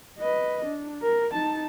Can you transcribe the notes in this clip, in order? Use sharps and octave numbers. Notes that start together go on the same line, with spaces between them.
B4 D#5
D4
A#4
D#4 A5